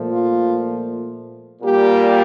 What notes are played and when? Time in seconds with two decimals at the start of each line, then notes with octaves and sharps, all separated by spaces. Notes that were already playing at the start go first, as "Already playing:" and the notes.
Already playing: A#2 F3 A3
0.09 F4
1.62 A#2 G3 A#3 G4